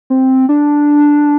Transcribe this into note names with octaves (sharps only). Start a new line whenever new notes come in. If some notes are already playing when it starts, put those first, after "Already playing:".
C4
D4